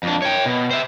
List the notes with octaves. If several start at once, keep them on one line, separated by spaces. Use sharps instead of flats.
F2 D4
C#5 G5
B2
C5 E5